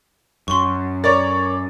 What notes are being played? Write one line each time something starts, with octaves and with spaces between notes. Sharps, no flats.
F#2 C6 C#6
A#4 C#5 D5 A6